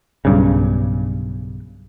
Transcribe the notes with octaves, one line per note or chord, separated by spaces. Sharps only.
B1 G2 C#3